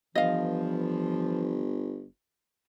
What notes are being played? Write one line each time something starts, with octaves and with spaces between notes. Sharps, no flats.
G1 E3 F3 D#5 F5